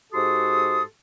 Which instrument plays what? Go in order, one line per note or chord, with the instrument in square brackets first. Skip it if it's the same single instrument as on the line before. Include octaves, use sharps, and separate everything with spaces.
[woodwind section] G#2 F#4 G4 A4 C6 D#6